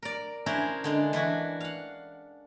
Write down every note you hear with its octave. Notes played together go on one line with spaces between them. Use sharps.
A#4 D5
C#4 D4 E4 G#4 A#4 C5
D3 G#3 D4
E3 D4 E4 F#4
F5 F#5